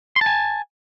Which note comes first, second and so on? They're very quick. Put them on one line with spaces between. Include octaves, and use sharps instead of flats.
C6 A5 G#5